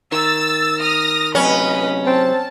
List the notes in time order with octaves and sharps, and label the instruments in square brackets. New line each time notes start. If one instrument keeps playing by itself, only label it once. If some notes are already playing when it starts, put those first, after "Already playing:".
[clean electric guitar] D#3 [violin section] E6 A6
[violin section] D#6 F6 A#6
[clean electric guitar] F#2 C3 [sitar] C#4 [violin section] B4 D#5 B5
[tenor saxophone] C4 [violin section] A5